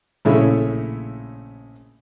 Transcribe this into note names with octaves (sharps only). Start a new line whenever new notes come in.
A#1 A2 C#3 A3 E4 C#5